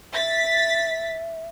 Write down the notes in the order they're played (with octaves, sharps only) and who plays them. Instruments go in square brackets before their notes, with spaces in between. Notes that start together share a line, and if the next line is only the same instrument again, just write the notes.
[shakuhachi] E5 [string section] A6 B6